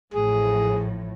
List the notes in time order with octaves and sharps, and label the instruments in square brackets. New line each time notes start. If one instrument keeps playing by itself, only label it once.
[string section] A1 A2 F3 [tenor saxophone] G#4